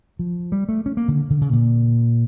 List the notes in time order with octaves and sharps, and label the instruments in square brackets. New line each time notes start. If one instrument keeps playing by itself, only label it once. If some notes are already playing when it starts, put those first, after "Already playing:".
[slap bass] F3
G3
A3
C#4
A#3
D3
D3
C#3
A#2